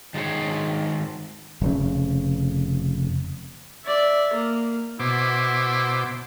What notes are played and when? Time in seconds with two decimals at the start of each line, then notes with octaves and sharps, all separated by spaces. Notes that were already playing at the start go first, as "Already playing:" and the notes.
0.14 D#3 G#3 F4 C5 C#5
1.61 F1 C#3
3.85 D5 E5
4.33 A#3
5.00 B2 E4 C5 D6